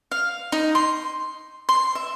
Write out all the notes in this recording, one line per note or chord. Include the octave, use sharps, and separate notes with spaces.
F5
D#4
C6
C6
E5